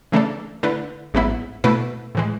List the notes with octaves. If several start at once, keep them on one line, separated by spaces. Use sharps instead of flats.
C#3 E3 A3 D4 A4
D3 A3 E4 B4
A1 G#2 F#3 B3 E4
B2 A3 E4 B4
A2 E3 G#3